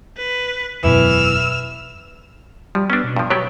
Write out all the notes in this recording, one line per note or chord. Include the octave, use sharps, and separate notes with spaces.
B4
E1 F#2 B2 E3 E6 F6
F3 G3
B3 C#4 D4 E6
B2
G2 F3
F#3 B3 G4 C#5